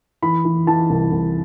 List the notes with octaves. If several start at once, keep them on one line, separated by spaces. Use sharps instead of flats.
E3 B5
E3
E3 A5
C2
C2